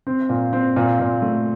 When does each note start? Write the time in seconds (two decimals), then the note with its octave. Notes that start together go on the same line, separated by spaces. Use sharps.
0.07 C4
0.29 A#2
0.53 C4
0.76 A#2
0.99 A#2
1.22 A3